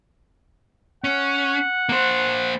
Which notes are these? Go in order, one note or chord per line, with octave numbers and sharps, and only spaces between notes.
C#4 F#5
A#3 C5